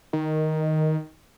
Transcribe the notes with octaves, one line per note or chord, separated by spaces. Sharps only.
D#3